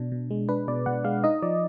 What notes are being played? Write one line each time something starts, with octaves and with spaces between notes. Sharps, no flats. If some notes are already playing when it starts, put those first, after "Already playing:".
Already playing: B2 D4
B2
G#3
D4 B4
B2 D5
B2 F#5
G#3 F5
D#4 D#5
F3 D5